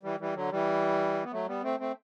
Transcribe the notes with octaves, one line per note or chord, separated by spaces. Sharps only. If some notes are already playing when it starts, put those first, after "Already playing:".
E3 G3
E3 G3
D3 F#3
E3 G3
B3
F#3 A3
G3 B3
A3 C4
A3 C4